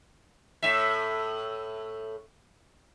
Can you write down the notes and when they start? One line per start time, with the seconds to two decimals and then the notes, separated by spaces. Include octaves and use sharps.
0.62 A2 E5